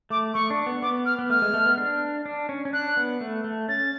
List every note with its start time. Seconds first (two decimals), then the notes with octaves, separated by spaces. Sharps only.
0.10 A3 D6
0.34 A3 C#6
0.50 D4
0.66 B3
0.82 B3 D6
1.06 F6
1.19 B3
1.30 A3 F6
1.42 G#3
1.54 A3
1.66 B3
1.78 D4
2.26 D4
2.49 C#4
2.65 C#4
2.73 D4 F#6
2.97 B3
3.21 A3
3.44 A3
3.69 C#4 A6